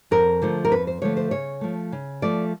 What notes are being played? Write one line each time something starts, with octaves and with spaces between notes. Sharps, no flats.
F2 A#4
D3 F3 A3
A#4
F2 B4
C5
D3 F3 A3 C#5
C5
C#3 C#5
F3 A3
C#3
F3 A3 D5